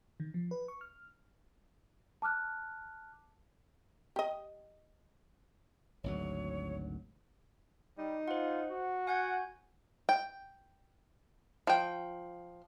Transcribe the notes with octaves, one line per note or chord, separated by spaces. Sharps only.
D#3
F3
B4
C#6
F6
A5 D6 F6 F#6
G4 D#5
G#1 D2 F#3 C#5
G3 D#4
F4 C5 F#5
F#4
F#5 G#5 G6 G#6
G5
F3 G5